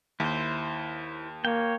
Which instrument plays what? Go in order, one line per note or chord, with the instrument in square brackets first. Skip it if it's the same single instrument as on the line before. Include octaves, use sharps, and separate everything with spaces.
[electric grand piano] D#2 [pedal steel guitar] E4 C5
[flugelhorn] A#3 [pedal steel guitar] C#5 G5